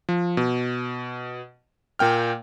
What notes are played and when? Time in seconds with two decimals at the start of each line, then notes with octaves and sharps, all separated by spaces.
0.09 F3
0.37 B2
1.99 A#2 A#3 G5 F6